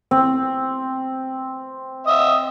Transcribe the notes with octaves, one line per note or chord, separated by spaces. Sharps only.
C4
D#5 E5